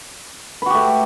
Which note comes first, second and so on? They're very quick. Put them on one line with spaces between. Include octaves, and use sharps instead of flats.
B4 F#4 G4 A3